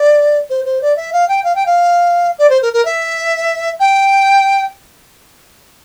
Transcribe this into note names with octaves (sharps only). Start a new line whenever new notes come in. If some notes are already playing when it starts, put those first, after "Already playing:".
Already playing: D5
C5
C5
D5
E5
F5
G5
F5
G5
F5
D5
C5
A#4
A#4
E5
G5